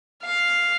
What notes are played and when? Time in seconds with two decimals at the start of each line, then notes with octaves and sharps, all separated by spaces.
0.24 F5